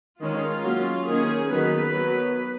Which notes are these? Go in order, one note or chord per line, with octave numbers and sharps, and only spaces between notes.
D#3 G#3 C#4 F4
F#3 A#3 C#4
D#3 A#3 C#4 G#4
D#3 F#3 B3 B4
F#3 B3